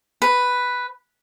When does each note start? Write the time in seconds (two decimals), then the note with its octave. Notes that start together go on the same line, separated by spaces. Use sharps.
0.22 B4